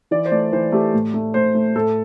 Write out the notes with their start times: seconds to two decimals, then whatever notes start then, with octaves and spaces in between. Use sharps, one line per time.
0.11 E3 D5
0.25 C5
0.31 A3 D5
0.53 E3 C5
0.72 A3 G4
0.93 A2
1.14 A3
1.34 A2 C5
1.55 A3
1.75 A2 A4